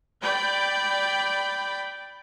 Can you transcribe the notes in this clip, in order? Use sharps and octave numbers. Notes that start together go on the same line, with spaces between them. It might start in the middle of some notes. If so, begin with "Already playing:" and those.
D5 G5 B5